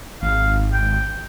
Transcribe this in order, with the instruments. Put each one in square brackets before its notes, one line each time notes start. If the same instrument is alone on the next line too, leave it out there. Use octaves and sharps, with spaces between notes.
[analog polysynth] G#1 [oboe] F5
[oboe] G5